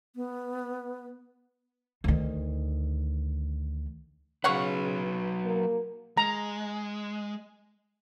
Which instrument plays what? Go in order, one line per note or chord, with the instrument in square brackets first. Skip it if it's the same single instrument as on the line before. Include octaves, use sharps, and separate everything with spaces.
[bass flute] B3
[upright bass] D2 D#3
[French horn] C#3 [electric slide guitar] F#3 B4 [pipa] C#5 F5 F#5
[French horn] A#3
[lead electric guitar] G#3 [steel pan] A#5